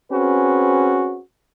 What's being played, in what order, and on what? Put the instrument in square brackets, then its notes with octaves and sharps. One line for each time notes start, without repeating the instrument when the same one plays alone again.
[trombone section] C4 C#4 F#4 G#4 B4